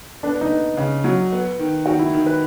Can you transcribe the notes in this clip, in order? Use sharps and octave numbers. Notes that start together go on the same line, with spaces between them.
B3 D4
D#4
B3
C#3
F#3
B3
D#3
D#3 F#4
E4
D#3
B4